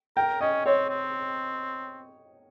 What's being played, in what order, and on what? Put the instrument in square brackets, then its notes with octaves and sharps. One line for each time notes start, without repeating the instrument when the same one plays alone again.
[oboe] A#4 [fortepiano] G5
[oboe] C#4 [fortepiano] D#5
[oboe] C4 [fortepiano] C#5
[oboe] C4